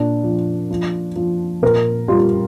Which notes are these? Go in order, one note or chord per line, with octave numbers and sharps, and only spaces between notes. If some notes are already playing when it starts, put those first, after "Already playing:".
Already playing: A#2 D4
F3
F3
F3
A#2 A#4
G3 F4